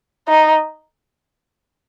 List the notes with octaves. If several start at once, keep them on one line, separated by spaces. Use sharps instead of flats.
D#4